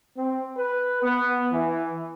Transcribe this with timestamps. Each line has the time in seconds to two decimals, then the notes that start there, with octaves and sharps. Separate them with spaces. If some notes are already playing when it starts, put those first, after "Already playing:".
0.17 C4
0.58 B4
1.03 B3
1.52 E3